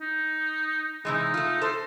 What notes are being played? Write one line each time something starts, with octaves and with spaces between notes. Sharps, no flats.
D#4
C3 E3 G#3 D#4
A3 F4
A4 C5